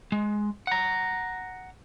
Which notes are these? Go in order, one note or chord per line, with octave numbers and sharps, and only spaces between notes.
G#3
F#5 A#5